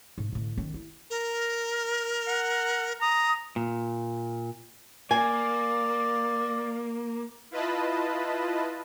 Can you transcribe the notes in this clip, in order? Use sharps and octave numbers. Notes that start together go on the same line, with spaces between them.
G#2
A2 D3
D#3 C#4
E4
A#4
F#5
A#5 D#6
A#2
A#3 D5 G#5
E4 F4 B4 D#5 A5 B5